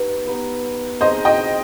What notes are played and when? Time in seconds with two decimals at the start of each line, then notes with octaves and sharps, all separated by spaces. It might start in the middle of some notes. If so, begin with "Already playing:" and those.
Already playing: B3 D#4 G4 B4
0.27 B3 D#4 G4 B4
1.01 C4 D#4 G#4 C5 D#5
1.25 D#5 G5